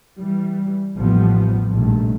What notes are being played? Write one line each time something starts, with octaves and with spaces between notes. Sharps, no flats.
E3 G3
A1 D#2 F3 G3 B3
A#1 G2 C3 D#3 A3